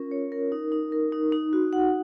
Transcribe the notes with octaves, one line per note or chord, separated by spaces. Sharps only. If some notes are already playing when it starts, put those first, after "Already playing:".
Already playing: C#4 F4 A#4
C#5
A#4
D#4
D#4
A#4
D#4
D#4
F#4
F#5